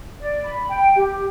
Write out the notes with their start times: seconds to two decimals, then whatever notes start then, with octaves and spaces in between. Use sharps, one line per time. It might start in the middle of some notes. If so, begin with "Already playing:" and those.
0.20 D5
0.45 B5
0.70 G5
0.95 G4